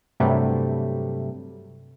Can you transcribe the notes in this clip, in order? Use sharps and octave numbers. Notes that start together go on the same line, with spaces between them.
G2 C3 F#3 G3 A3